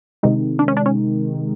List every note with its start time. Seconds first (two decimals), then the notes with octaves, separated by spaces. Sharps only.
0.23 C3 D#3 G#3 D#4
0.59 D4
0.68 C#4
0.77 D4
0.86 C#4